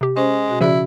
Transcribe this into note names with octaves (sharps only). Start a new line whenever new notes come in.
C3 G4
G#3 C#4 C5
B2 F#4
C#3 F3 C#4 E4 F#4 D5